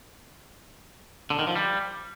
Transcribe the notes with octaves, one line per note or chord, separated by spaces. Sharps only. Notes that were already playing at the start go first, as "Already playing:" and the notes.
D3
D#3
F3
G3